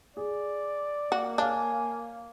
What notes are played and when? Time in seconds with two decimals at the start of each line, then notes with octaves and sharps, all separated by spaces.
0.17 G#4 D5
1.12 A#3 F#4
1.38 D4 C#5 F5 G#5 F6